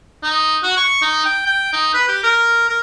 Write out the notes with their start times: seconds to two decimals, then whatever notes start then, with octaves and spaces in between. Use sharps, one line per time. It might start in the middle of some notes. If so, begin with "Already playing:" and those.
0.23 D#4
0.63 F#4
0.77 C#6
1.02 D#4
1.25 G5
1.46 G5
1.73 D#4
1.94 B4
2.08 G4
2.23 A#4
2.69 A#4